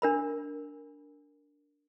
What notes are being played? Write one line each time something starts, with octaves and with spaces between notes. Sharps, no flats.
D4 A#4 B5